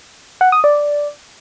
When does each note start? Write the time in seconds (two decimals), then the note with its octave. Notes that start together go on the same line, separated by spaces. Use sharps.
0.41 F#5
0.52 D#6
0.64 D5